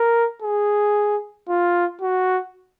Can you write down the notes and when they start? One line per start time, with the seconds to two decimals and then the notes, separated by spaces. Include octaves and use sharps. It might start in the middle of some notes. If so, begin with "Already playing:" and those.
Already playing: A#4
0.42 G#4
1.49 F4
2.01 F#4